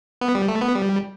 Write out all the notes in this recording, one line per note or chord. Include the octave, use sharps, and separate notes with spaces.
B3
G3
A3
B3
G3